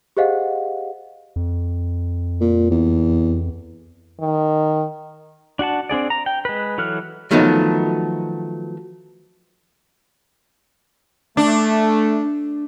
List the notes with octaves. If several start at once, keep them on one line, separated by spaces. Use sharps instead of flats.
G4 G#4 C5 D#5 F5 F#5
F2
A#2
E2
D#3
D4 F#4 F#5 A5
C4 D4 G#4 D5
A#5
G5
G#3 B4
E3 F#3 A4 F6 F#6
D#3 F3 F#3 A3 B3 D#4
A3 D4